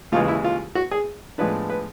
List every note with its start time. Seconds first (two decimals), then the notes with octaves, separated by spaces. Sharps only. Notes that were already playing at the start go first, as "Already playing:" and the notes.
0.12 D#2 C#3 E3 G#3 F4
0.28 E4
0.44 F4
0.75 F#4
0.91 G#4
1.38 A2 F3 G#3 B3 D4 B4
1.70 B4